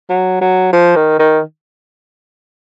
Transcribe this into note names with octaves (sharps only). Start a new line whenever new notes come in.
F#3
F#3
F3
D#3
D#3